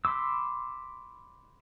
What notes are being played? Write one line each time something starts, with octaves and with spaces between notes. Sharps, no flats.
B5 C6 D6 E6